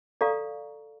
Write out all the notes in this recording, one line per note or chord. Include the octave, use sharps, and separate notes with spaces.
A4 D5 F5 A#5 C#6